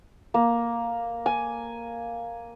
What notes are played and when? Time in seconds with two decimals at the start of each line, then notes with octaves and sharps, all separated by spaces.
0.34 A#3
1.26 G#5